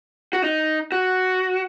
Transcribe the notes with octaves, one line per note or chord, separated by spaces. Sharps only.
F#4
D#4
F#4